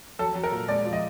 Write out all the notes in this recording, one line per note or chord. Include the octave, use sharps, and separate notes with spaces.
F#3 A4
F#3
A#4
A#2
G#3 D5
F3
D#5